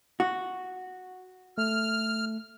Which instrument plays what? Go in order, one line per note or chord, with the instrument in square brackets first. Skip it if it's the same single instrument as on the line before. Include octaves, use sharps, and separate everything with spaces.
[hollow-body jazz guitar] F#4
[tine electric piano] A3 [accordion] F6